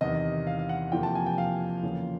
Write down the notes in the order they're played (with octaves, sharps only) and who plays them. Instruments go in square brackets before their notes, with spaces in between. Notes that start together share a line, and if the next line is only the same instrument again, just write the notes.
[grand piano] E2 C3 D#3 D#5
F5
F5
F#5
F2 C3 F3 A#3 G5
A5
G#5
G5
F5
E2 C#3 F3 A#3